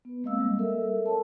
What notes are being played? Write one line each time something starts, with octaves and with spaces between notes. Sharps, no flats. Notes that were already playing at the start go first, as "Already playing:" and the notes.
B3 B4
G#3 A#3 C4 D#5 F5 E6
G3
A4 A#4 E5
A4 C#5 A5